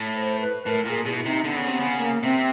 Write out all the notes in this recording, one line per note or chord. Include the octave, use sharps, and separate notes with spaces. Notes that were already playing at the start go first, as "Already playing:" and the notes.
Already playing: A2
C5
B4
A2 A#4
A#2 G#4 A#4
B2 E4 G#4
C3 D#4
D3 B3
C#3
C3 B3
C#3
A#3
C3 C4